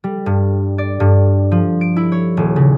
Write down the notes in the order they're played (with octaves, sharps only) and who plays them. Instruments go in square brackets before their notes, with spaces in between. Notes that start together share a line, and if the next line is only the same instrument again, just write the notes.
[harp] G3
G2
D5
G2
F3
D7
E4
C#5
D#1
C#3